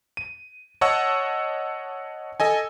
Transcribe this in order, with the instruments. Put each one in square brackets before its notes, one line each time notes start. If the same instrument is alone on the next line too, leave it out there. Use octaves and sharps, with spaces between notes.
[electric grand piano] D#7
C#5 D#5 F#5 A5 C#6 E6
A4 D#5 G#5